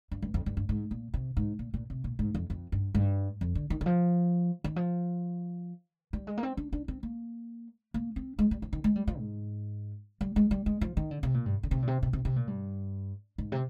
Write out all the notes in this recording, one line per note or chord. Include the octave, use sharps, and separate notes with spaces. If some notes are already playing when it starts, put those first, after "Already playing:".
G2
G2
F2
G2
G2
G#2
A#2
C3
G#2
A#2
A#2
C3
A#2
G#2
F2
F2
G2
G2
F2
D3
D#3
D#3
F3
D#3
F3
G3
G#3
A#3
C4
D4
D4
C4
A#3
A#3
C4
G#3
G3
F3
D#3
G#3
G3
F3
G#2
G3
G#3
G3
G#3
F3
D#3
D3
C3
A#2
G2
D3
C3
A#2
C3
C3
C3
C3
A#2
G2
G#2
C3